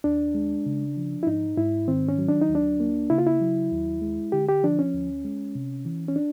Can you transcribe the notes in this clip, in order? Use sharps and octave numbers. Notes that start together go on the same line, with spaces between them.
D#2 D4
G#3
C#3
F3
E4
G#2 D#4
G#2 E4
D#3 C4
C#4
F#3
D4
D#4
D2
D4
A#3
C#3 E4
F4
E4
F#3
D#2
G#3
D3 G4
G4
F3 D4
C#4
D2
G#3
C3
E3
C#4
D4